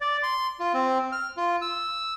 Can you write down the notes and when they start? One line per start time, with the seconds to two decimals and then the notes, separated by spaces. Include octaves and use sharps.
0.01 D5
0.23 C6
0.60 F4
0.74 C4
1.12 F6
1.37 F4
1.62 E6